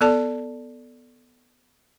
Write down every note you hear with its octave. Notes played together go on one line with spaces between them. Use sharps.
B3 A4 D5 A5